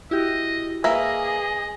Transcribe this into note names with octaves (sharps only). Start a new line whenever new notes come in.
E4 F#4 G4 D#5
A#3 G#4 B4 D#5 E5 A#6